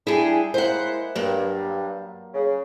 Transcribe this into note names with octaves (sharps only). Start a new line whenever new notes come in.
G3 D4 E4 G#4
G#3 A#3 E4 C5 F#5
G2 F#3 A#3
C#3